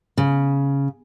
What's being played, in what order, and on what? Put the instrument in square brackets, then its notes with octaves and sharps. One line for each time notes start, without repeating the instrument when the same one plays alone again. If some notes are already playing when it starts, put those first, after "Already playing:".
[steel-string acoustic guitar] C#3